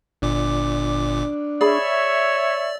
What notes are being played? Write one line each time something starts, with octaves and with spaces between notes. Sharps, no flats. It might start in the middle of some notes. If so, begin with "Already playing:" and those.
G1 A#2 D4 D6
G#4 C#5 D5 E5 B5